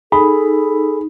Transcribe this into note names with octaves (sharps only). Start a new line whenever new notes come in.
D#4 G#4 A4 B5